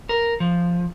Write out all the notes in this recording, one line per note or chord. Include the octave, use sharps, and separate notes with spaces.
A#4
F3